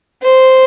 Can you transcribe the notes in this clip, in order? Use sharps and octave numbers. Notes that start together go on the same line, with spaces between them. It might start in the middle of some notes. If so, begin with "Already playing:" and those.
C5